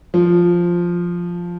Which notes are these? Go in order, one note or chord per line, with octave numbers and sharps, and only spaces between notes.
F3